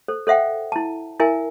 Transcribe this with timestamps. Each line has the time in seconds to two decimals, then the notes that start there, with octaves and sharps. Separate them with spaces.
0.08 A4 C5
0.27 A4 C5 E5 F#5 G5
0.72 E4 A5
1.20 E4 A#4 E5 G#5